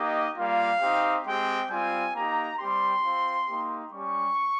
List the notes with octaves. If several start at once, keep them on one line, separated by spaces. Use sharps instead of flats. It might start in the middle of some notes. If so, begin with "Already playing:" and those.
Already playing: A#3 D#4 G4 D#5
G3 A#3 F4 F5
C4 D#4 G4
G#3 C4 G4 G5
G3 C4 F4 G#5
A#3 D#4 G4 A#5
G3 C4 G4 C6
C4 F4
A#3 D#4 G4
G3 C#4 G4 C#6